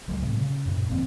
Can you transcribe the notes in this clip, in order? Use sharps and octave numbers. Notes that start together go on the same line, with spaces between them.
C#2 F#3 G#3 A3
A2 C3
C#3
F#2 A#2
G1 F2 A#3 C4